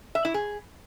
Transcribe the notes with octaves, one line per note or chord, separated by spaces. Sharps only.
E5
E4
G#4